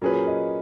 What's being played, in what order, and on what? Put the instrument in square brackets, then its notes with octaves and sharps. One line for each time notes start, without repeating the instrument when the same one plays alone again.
[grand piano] A#2 F#3 C#4 G#4 B4 [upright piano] A#4
[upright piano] D#5